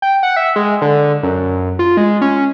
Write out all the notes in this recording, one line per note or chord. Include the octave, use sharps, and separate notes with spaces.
G5
F#5
E5
G#3
D3
F#2
F4
G#3
C#4